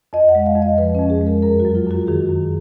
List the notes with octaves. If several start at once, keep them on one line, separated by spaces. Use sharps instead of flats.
F2 D#5
F#5
G#3
F5
F2
D#5
F3 B4
C#4
F2
G#4
G#3
A#4
F#2 A#4
F#4
F#3
F4
F#2 F#4
D#3 G#4
F#2